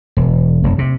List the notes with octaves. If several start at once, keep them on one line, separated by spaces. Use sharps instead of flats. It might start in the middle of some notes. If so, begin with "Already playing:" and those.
E1
F1
C3